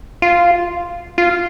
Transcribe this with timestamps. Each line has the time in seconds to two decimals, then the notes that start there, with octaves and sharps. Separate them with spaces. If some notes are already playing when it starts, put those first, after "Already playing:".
0.22 F4
1.18 F4